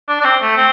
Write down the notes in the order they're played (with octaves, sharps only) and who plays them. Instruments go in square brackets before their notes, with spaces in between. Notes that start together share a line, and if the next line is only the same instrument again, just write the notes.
[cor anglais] D4
D4
C4
A3
C4